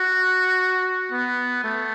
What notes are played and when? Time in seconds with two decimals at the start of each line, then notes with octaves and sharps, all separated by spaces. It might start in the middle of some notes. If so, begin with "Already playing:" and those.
Already playing: F#4
1.12 B3
1.64 A3